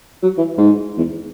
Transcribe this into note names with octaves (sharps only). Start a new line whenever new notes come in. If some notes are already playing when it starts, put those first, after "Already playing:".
F#3
E3
G#2
E2